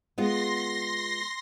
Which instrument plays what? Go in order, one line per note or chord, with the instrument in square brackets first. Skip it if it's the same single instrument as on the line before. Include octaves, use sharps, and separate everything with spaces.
[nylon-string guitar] G#3 B3 F4 [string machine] C6 A#6